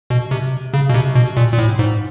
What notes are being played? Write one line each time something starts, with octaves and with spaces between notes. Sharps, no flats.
B2
C3
C#3
B2
C3
B2
A#2
A#2
A2
G#2